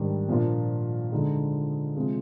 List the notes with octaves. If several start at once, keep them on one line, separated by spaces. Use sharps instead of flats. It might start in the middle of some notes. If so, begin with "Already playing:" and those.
Already playing: G#2 D#3 G3 D4
A#2 F3 A#3 D4 F4
D3 G#3 D#4
C3 F3 G#3